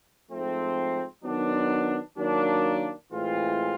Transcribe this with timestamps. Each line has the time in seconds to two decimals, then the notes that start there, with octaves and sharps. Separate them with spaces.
0.31 G#2 F3 A3 C4
1.24 D#3 F#3 B3 D4
2.17 D#3 F#3 A#3 D4
3.10 A2 E3 G#3 C4 F4